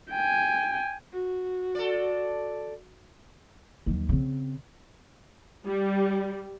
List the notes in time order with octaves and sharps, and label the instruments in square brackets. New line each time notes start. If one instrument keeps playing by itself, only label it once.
[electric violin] G5 G#5
[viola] F#4
[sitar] A4 D5
[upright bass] D#2 F#3
C#3 C4
[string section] G3